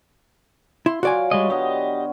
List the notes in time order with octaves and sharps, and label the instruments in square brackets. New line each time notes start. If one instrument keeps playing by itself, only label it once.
[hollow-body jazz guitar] E4 [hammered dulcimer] C6
[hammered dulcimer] F#3 F4 C#5 [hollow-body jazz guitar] F#4 D5 G#5
[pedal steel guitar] G3 G#3 D#5
[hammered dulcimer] D3 B3 [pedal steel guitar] G4 D#5